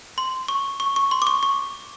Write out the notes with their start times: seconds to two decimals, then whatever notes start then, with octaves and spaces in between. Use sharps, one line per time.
0.18 C6
0.48 C#6
0.80 C#6
0.96 C#6
1.11 C6
1.22 D6
1.27 C#6
1.43 C#6